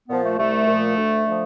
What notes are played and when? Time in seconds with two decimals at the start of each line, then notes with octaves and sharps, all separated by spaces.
0.08 A#2 F3 B3
0.23 A3
0.38 C2 A3
0.67 A#2 F3
0.96 D2
1.26 D3 F3